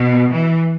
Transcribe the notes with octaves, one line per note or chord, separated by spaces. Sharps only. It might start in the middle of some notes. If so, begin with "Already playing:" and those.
Already playing: B2
E3